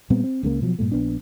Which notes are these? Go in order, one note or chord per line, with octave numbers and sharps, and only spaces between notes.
A#2 G3 B3 C4
C4
C#2 C#3 G3 A#3
B2 F3 F#3
G2 A#2 A3
A#1 B3 D4